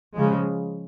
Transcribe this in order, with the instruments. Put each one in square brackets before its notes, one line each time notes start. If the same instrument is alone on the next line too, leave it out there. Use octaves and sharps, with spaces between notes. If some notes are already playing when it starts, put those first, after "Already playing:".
[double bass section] C#3 F3 G#3